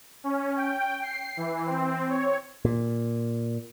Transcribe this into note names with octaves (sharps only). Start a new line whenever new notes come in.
C#4
G5
C7
E3
C4
C#5
A#2